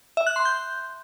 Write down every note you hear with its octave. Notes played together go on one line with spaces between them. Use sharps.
E5
F#6
C6
G6